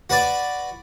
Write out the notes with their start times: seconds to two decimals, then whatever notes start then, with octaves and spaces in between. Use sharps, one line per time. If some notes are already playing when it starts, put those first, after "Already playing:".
0.10 F#4 B4 D5